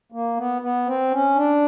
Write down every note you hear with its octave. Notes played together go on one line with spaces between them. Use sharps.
A#3
B3
B3
C4
C#4
D4